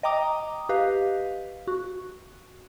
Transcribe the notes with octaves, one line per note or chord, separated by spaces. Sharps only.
D#5 G5 A#5 D6 D#6
G4 B4 D#5 F5
F#4